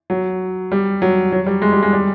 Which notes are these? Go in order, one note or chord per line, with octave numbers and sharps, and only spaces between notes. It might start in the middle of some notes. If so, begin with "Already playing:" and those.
F#3
G3
F#3
F#3
G3
G#3
G3
G#3
G3